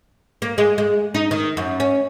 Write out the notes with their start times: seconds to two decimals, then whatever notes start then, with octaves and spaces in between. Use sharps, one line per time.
0.42 A#3
0.58 G#3
0.78 G#3
1.14 D#4
1.31 D#3
1.57 F#2
1.80 C#4